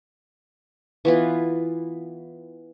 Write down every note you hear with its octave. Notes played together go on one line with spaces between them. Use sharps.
E3 B3 F4